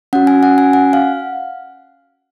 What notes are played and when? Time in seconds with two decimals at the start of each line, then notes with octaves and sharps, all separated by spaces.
0.13 C#4 F#4 F#5
0.27 G#5
0.43 F#5
0.58 G#5
0.73 F#5
0.93 F5